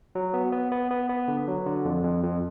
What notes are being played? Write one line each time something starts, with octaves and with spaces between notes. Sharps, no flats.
F#3
B3
B3
B3
B3
B3
D3
F#3
D3
F2
F2
F2